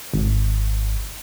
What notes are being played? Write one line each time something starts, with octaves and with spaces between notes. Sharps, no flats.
G#1